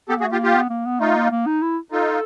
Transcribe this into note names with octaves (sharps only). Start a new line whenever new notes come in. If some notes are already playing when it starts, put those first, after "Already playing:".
B3 G4 A4
A#3
F#4 G#4
A3
A#3 F4 G4
F4 G4
B3
A#3
B3
A3 D#4 F4
A#3
A#3
D#4
E4
D#4 F4 A4